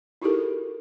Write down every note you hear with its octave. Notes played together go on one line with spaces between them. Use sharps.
D#4 E4 F#4 G4 A4 A#4